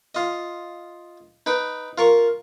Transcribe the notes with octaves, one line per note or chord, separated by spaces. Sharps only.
F4 D#5
D#4 B4 G5
F4 A#4 C#6